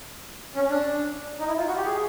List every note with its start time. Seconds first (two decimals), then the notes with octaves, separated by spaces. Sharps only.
0.56 C#4
0.70 D4
1.40 D#4
1.48 E4
1.58 F4
1.67 F#4
1.77 G4
1.86 G#4